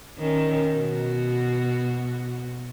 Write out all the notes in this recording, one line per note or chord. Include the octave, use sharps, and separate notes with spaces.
D#3 C#4
B2 F#4